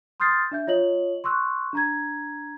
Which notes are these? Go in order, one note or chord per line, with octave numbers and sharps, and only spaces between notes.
C6 D#6 F6 G6 A6 C7
D4 E5 G6
F4 C#5 D#5 F#7
C6 C#6 E6 F#6
D4 A#5 G#6